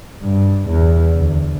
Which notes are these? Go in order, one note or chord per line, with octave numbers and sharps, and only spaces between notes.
G2
E2
D2